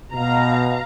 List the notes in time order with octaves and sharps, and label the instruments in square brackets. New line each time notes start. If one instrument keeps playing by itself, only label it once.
[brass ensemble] B2 [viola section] F5 A#5